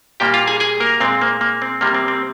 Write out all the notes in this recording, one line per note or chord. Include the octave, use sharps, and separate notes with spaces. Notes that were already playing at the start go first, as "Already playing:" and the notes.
A#2 G3 A#3 G4 G5
F4 F5
G#4 G#5
G#4 G#5
A#3 A#4
A#2 G#3 C4
A#3
A#3
C4
C3 G3 A#3
C4
C4